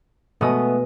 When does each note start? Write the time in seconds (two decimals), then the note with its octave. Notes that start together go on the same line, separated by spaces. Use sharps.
0.41 B2 G#3 A3 B3 D#6